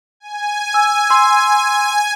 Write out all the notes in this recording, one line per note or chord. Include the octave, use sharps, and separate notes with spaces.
G#5
E6
C6 E6